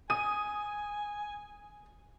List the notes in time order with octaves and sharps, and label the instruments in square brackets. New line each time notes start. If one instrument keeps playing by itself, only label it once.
[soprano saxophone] G#5 [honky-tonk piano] D#6 D#7